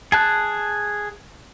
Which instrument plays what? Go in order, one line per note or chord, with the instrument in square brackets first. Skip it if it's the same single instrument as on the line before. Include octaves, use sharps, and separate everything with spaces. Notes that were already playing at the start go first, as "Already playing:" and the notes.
[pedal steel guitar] G#4 A5 F#6